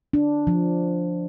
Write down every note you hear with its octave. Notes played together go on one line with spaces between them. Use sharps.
D4
F3